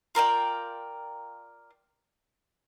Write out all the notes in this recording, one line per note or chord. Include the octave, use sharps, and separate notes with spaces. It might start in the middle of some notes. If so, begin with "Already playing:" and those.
F4 A#4 D5 G5